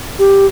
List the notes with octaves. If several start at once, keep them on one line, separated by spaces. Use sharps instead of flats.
G4